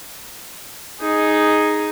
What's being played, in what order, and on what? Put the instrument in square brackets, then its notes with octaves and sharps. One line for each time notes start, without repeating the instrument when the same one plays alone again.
[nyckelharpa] D#4 G#4